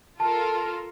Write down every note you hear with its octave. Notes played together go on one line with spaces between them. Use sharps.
F4 A4 A#4 A5